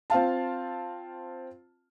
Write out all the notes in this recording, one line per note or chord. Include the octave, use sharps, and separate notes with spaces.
C4 F4 F5 A5